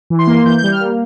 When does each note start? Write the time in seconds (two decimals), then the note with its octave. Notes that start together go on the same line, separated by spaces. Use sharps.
0.10 E3
0.19 C6
0.27 A#3
0.45 E3 G6
0.58 G6
0.63 G3
0.72 F6
0.80 A#3